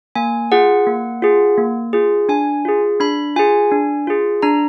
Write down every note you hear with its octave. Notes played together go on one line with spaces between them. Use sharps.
A#3 G#5
F4 G#4 F#5
A#3
F4 G#4
A#3
F4 G#4
D4 G#5
F4 G#4
D4 B5
F4 G#4 G#5
D4
F4 G#4
D4 A#5